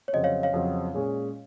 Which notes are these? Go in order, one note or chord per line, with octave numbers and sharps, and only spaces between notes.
C#5
F2 C#3 F#3 C4 D#5
C#5 F5
C#5 F5
F2 C#3 F#3 C4
A#2 G#3 C#4 G#4